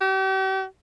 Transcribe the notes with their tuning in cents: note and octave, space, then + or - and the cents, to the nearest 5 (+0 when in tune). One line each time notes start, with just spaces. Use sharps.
G4 -40